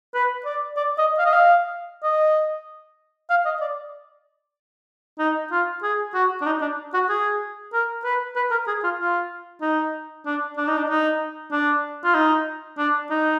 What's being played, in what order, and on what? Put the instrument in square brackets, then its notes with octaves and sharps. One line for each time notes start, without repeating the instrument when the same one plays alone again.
[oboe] B4
D5
D5
D#5
F5
D#5
F5
D#5
F5
D#5
D5
D#4
F4
G#4
F#4
D4
D#4
D4
F#4
G#4
A#4
B4
B4
A#4
G#4
F4
F4
D#4
D4
D4
D#4
D4
D#4
D4
F4
D#4
D4
D#4